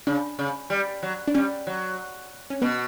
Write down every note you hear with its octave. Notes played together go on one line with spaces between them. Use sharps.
C#3 D4
C#3
G3
F#3
D4
G3 C#4
F#3
C#4
B2 B3